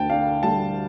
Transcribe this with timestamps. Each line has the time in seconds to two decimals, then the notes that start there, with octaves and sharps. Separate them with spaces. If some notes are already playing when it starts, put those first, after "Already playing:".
Already playing: D2 D3 G5 A5
0.10 D4 F5
0.43 G3 A5